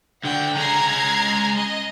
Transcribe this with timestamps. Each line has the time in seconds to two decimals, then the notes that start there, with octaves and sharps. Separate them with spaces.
0.24 D2 D3 F#5 G5
0.56 G#3 C#4 A#5 G#6 C7
1.55 D#5